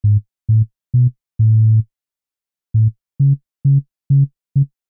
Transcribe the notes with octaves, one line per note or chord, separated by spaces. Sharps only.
G#2
A2
B2
A2
A2
C#3
C#3
C#3
C#3